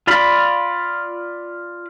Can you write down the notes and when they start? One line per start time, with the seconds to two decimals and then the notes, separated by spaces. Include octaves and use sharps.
0.07 F4 D5 F5 B5